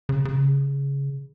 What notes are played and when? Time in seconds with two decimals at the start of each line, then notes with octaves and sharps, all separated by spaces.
0.09 C#3
0.25 C#3